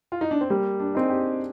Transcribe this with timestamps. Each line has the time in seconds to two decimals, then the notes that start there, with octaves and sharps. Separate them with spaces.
0.12 F4
0.21 D#4
0.31 D4
0.41 C4
0.50 G3 A#3
0.80 D4
0.95 C4 D#4 G#4
1.10 G4